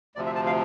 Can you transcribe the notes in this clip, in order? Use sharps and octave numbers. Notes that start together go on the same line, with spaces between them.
D2 C3 F3 D5
E5
A5
F5